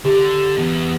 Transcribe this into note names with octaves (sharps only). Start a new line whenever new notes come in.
D3 G4
E2